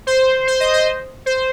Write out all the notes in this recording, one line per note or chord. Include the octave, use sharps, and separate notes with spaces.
C5
C5
D#5
C5
C5